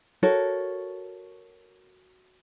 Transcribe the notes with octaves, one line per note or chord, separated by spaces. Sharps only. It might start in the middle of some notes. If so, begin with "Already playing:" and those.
F#4 A4 A#4 C#5